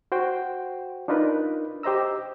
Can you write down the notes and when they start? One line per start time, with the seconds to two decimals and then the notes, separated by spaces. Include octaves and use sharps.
0.12 F#4 C5 G5
1.08 D4 D#4 F4 A#4 B4
1.83 G4 C5 D#5 A#5 E6